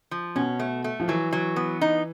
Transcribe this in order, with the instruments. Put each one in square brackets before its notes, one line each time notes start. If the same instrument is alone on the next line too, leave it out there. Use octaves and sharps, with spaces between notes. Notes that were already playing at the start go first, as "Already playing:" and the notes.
[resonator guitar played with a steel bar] F3
[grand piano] B2 [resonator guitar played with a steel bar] C#4
[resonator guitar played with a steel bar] A3
A3
[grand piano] F3
[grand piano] E3 [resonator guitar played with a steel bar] F#3
[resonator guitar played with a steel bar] F#3
B3
D#4